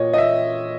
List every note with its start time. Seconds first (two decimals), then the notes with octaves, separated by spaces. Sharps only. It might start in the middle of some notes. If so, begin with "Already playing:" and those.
Already playing: A#2 C#5 D#5
0.13 D#5
0.18 E5